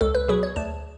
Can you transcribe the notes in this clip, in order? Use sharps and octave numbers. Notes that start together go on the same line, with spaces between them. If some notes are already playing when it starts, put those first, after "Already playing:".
C#2 A4
B4
B2 F#3 G#4
C#5
D2 A5